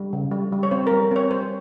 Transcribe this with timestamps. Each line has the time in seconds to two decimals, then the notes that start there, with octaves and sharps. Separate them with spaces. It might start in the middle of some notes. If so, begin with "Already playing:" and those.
Already playing: G3
0.13 C#3
0.31 G3
0.52 G3
0.63 C#5
0.71 C4 C5
0.87 G3 A#4
1.11 C4 C#5
1.31 G3 C5